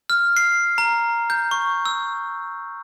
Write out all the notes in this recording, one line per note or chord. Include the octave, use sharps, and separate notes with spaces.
F6
C7
A#5
G6
C#6
E6